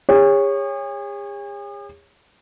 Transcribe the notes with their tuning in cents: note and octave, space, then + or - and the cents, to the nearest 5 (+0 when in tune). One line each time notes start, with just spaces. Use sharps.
G#4 -45 C#5 -5